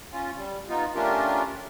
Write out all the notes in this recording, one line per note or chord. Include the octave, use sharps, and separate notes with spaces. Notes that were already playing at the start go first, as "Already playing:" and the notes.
C#4 F4
G3
B3 D#4 F4
A3 C#4 D4 F4 G4 A#4